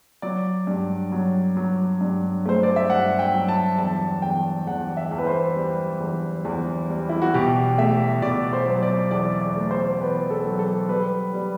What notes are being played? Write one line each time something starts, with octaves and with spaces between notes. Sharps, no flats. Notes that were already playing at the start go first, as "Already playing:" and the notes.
F#3 D5
G2
F#3
F#3
G2
A3 C5
D5
E5
G2 F#5
G5
F#3
A5
E2 A5
E2 G5
E2 F#5
E5
E2
B4
C5
G3
E2
E2
G3
E4
F#4
B2 G4
A3 E5
B2 D5
C5
F#3
D5
E2 D5
D5
A3
C5
E2 B4
A4
F#3
A4
G3 B4
G3